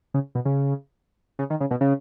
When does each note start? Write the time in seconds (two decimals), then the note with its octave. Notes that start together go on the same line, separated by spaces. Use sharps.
0.14 C#3
0.35 B2
0.45 C#3
1.39 C#3
1.50 D#3
1.60 C#3
1.71 B2
1.81 C#3